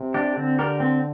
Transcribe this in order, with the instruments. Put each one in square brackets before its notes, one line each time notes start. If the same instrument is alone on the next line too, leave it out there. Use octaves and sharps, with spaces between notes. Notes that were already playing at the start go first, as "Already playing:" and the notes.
Already playing: [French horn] C3
[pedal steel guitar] D4 G4
[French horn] D3 [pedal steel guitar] C4
[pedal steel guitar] G4 A#4 D5
C4